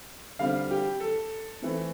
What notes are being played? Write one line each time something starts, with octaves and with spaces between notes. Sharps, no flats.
D3 G3 C4 F5
G4
A4
E3 A3 C4